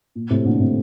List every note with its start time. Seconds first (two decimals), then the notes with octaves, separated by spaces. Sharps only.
0.15 A#2
0.30 A2 C3
0.45 A#2 D3
0.60 A2 C3